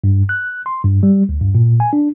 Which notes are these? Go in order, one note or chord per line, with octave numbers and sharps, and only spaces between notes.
G2
F#6
C6
G2
G3
D2
G2
A#2
G#5
D4